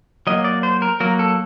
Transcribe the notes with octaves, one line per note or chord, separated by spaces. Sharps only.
F#3 A#3 D#5
D5
C5
A#4
F#3 A#3 A#4
A4